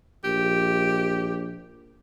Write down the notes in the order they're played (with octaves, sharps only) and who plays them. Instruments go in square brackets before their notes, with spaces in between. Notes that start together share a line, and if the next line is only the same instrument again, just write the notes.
[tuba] A#1 [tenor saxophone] G4